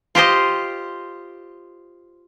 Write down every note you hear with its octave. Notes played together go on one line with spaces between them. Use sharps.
F4 G4 C5 D#5